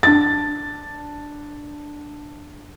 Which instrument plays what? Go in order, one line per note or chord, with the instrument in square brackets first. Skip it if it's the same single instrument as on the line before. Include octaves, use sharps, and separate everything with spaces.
[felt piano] D4 A6